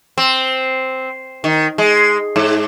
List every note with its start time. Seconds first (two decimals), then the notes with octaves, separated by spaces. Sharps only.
0.18 C4
1.44 D#3
1.78 G#3
2.36 G#2